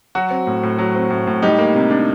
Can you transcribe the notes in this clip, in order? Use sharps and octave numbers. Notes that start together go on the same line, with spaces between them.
F#3 F#4
C4
A2
A2
F#3
C4
A2
A2
G3 D#4 G4
A#3
C3
D4